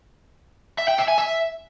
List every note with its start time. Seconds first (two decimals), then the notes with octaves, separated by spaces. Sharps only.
0.78 E5
0.88 G5
0.98 E5
1.08 G#5
1.18 E5